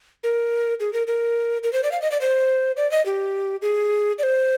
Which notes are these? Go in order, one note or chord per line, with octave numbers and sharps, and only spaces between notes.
A#4
G#4
A#4
A#4
A#4
C5
D5
F5
D#5
D5
C5
D5
D#5
G4
G#4
D5
C5